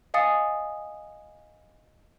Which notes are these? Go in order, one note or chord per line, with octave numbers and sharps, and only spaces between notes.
D#5 F5 G#5 D#6 A6 C#7